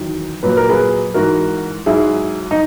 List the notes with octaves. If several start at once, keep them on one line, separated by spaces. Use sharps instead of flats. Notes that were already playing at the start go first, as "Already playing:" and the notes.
Already playing: E2 D#3 F#3
A#2 F#3 B4
A#4
G#4 B4
G#2 E3 F#4 A#4
G#2 F#3 E4 G#4
D#4